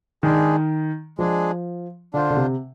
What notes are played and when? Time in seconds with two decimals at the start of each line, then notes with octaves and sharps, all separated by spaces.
0.23 D#3 G#3 D4 G#4
1.18 F3 G#3 D4 G#4
2.13 D3 D4 F4 C5
2.31 D3
2.37 C3